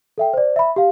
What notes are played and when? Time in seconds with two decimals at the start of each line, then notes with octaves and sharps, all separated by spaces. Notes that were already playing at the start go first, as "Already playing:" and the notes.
0.18 A4 E5 G5
0.33 C5 D5
0.56 E5 B5
0.76 G4 F5